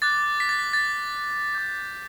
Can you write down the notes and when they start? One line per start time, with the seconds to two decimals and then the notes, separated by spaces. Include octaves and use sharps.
0.02 D6 F#6 A6
0.40 B6
0.49 A6
0.59 B6
0.73 A6
0.79 B6
1.55 D6 G6